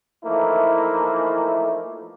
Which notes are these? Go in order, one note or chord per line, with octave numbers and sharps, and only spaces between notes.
E3 F3 A3 A#3 D#4 E4